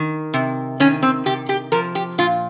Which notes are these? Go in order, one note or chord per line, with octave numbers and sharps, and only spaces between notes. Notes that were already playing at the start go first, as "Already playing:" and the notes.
Already playing: D#3
C3
D#3 C#4
C4
C3 G4
G4
F3 A#4
G4
A#2 F4